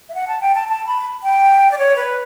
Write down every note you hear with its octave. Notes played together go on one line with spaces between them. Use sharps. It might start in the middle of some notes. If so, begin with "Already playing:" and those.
E5
F#5
A5
G5
A5
A5
B5
G5
D5
C#5
B4